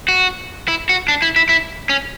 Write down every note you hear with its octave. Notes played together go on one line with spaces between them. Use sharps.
F#4
E4
F#4
D4
E4
E4
E4
C#4